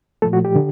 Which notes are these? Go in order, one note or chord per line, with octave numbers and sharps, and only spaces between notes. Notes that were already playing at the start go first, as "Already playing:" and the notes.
A#2 F3 A3 A4
F#4
G4
D3